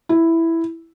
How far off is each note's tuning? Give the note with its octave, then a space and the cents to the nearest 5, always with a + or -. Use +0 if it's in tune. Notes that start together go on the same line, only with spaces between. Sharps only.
E4 +0